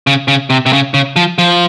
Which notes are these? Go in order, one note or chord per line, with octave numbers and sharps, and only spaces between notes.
C#3
C#3
C3
C3
C#3
C#3
F3
F3